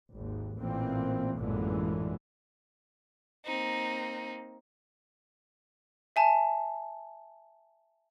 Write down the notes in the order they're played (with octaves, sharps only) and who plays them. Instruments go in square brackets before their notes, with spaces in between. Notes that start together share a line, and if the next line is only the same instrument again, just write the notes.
[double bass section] G#1 D#2
A1 A#2 E3 A#3 C4
A1 F#2 A#2 D3 E3 G#3
[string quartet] A#3 C4 D#4
[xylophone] E5 G#5 A5